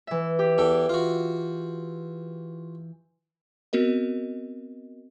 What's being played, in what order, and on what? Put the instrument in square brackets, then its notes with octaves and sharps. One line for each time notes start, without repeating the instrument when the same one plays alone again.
[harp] E3 E5
G4
[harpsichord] E2 A4 G5
F4 F#4
[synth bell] B3 C4 F#4 A#4 D#5